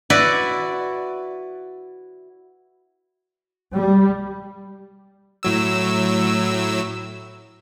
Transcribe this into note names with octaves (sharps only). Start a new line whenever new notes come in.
E4 F#4 B4 D5
G3
A2 F#3 E6